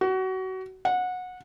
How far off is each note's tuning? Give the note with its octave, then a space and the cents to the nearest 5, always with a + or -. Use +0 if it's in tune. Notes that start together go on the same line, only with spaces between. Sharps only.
F#4 +25
F#5 -20